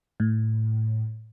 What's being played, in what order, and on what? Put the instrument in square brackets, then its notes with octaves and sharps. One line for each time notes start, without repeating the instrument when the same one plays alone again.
[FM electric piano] A2